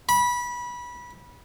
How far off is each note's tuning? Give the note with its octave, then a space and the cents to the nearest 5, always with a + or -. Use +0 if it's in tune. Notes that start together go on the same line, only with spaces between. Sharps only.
B5 -20